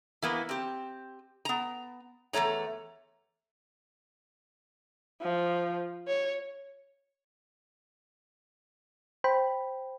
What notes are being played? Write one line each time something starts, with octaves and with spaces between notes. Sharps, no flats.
E3 A#3 B3
C4 G4
B3 A#5
E2 G#3 A3 C#5 A#5
F3
C#5
C5 G5 B5